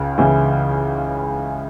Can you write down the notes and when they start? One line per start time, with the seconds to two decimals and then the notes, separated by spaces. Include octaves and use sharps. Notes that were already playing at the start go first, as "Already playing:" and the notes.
Already playing: C#2 C#3
0.18 C#2 C#3 E3